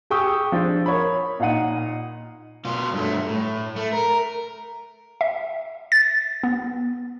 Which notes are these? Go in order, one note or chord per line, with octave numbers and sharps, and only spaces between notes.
G4 G#4 G5 C#6 D#6 E6
F3 D4
A#4 C#5 B5
A#2 D#4 F5 F#5 D#7
B2 F4
G2 A3
A2
A3
A#4
E5
A6
B3